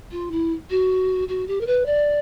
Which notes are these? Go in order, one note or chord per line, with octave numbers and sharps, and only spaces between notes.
F4
E4
F#4
F#4
G4
A#4
B4
D5